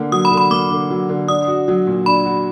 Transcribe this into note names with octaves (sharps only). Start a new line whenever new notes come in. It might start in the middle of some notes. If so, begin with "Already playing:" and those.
Already playing: D3 A#3
F#3 D#6
B5
D3
B5
A#3 D6
D3
F#3
D3
D4 D#6
F#4
F#3
A#2
D4 B5
F#4